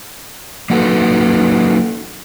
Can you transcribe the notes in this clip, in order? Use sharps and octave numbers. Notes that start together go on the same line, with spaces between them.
F#3 A#3 D#4 F#4 A4 B4